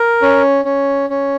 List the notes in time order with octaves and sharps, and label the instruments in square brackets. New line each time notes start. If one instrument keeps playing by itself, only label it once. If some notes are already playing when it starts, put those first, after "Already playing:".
Already playing: [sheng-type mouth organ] A#4
C#4
C#4
C#4